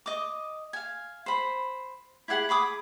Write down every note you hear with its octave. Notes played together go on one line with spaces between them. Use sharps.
D#5 D6
F5 G#5
C5 B5
E4 G4 G#4 F#5
G#4 B5 D6 D#6